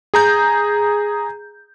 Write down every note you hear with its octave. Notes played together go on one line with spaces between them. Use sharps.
G#4 A#5 G6